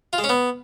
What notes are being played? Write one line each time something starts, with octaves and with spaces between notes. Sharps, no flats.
F4
G#3
C#4
B3